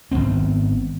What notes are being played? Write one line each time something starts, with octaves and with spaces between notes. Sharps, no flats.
G#1 G#2 B3 C4